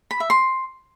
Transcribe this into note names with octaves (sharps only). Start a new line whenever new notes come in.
B5
E5
C6